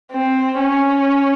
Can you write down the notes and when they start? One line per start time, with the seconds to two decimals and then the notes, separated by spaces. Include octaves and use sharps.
0.12 C4
0.59 C#4